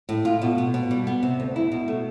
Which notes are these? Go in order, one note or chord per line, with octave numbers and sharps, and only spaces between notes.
A2
F4
B2
B3
B2
G3
B3
C3
D2
E4
B2
A3